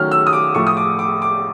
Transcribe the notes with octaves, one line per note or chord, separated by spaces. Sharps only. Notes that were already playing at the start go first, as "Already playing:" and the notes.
Already playing: D#3 F#3 A3 C#4 F6
E6
D#6
D6
A2 F3 A3 C#6
D#6
D6
D6
D6